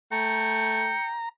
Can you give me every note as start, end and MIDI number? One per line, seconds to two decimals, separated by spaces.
0.12 0.96 57
0.12 1.17 79
0.12 1.29 82
0.12 1.05 97